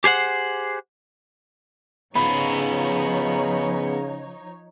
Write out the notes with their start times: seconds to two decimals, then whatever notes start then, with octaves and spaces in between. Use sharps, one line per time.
0.04 G4 G#4 C5 F#5
2.15 C#3 F3 B3 D#4 F4 C#5 B5